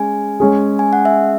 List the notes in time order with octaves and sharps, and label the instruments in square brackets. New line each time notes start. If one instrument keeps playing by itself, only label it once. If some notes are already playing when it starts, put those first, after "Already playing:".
Already playing: [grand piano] G#3 C#4 [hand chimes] G#5
[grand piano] G#3 C#4 G#4
[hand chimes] G#5
F#5
E5